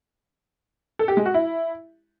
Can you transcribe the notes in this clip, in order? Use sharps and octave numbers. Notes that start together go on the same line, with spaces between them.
A4
G4
G#3
F#4
E4